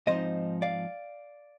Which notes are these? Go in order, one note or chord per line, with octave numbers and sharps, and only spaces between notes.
G#2 F3 C4 D#4 C5 D#5
D5 F5